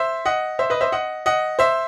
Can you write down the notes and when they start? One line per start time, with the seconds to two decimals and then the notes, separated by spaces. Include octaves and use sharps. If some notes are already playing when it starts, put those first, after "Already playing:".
Already playing: C5 E5
0.25 D#5 F#5
0.59 C5 E5
0.70 B4 D#5
0.81 C5 E5
0.92 D#5 F#5
1.26 D#5 F#5
1.59 C5 E5